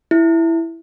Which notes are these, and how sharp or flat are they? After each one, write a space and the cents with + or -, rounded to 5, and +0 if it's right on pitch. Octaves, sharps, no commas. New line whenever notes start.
E4 +5